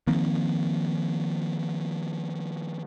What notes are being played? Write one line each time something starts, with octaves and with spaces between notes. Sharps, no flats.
D#3 F3 A#3 C4